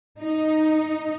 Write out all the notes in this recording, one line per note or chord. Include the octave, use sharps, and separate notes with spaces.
D#4